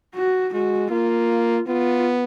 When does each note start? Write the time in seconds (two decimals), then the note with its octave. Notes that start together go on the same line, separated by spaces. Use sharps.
0.14 F#4
0.53 G#3 F#4
0.91 A#3 F4
1.67 B3 F4